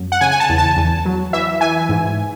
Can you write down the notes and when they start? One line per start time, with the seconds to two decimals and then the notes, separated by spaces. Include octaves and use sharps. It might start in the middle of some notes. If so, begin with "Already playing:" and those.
Already playing: F#2
0.12 F#5
0.21 C#3 G#5
0.31 G#5
0.40 A5
0.49 E2
0.58 A5
0.77 E2
1.05 F#3
1.33 E3 E5
1.61 E3 G#5
1.89 G#2